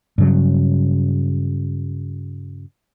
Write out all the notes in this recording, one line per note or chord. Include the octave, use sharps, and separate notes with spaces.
G2 C#3 F#3